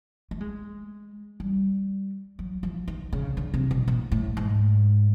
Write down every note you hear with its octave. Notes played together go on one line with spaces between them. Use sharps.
A3
G#3
G3
F#3
F3
D#3
C#3
D3
C3
B2
A#2
A2
G#2